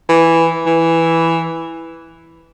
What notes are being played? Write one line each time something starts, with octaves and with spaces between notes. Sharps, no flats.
E3
E3